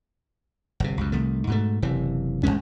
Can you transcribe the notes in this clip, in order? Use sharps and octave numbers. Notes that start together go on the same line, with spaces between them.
G1 C3
C#2 F#2
C2 D#3 A3
G#2 B2 A3
F#1 C3 E3
G#1 F#2 G#3 C#4